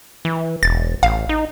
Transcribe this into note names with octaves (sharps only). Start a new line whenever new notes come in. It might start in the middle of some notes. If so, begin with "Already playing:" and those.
E3
E1 A6
A1 F5
D#4